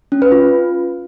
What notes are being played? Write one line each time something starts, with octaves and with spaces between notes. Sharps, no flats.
C#4
B4
F4